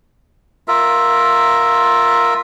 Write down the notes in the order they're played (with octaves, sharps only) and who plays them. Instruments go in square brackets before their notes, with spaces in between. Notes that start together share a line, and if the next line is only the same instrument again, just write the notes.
[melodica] F4 A#4 E5